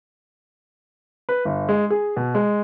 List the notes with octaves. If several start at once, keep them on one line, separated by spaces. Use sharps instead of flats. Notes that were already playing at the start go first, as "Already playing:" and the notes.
B4
G1
G#3
G#4
B2
G#3